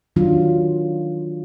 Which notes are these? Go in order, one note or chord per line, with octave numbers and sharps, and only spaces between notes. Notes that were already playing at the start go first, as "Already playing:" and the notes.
D#3 F#3 D4 F4